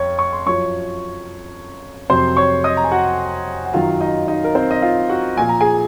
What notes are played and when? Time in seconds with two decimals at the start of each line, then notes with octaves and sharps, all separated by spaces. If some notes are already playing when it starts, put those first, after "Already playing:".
Already playing: F2 C#5 C#6
0.19 C#6
0.33 C6
0.46 F#2 F3 C#5 C#6
2.10 F2 C3 F#3 C5 C6
2.37 C#5 C#6
2.64 D#5 D#6
2.77 A#5
2.84 G#5
2.91 F#4 F#5
3.66 F#5
3.73 F#2 D#3 F#3 F4 F5
4.01 D#4 D#5
4.28 D#4 D#5
4.44 A#4
4.55 C4 C5
4.71 D#5
4.82 F4 F5
5.09 F#4 F#5
5.37 A#2 F3 G#5
5.49 A#5
5.61 G#4 G#5